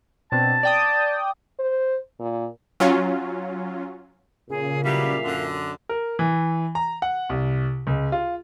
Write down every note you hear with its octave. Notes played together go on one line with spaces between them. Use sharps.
B2 C4 D4 A5
D5 G5 D#6
C5
A#2
F#3 C#4 F4
A#2 C#3 G#4
E3 F#3 G3 E5 F5
F#2 D3
A#4
E3
A#5
F#5
C2
C#2
F4